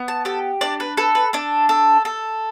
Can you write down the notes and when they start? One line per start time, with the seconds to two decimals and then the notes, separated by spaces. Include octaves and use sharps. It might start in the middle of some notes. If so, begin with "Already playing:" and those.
Already playing: B3
0.08 A5
0.25 G4 A4
0.61 D4 D5
0.80 B4
0.97 A4 B4
1.15 B4
1.33 D4 A4
1.69 A4
2.05 A4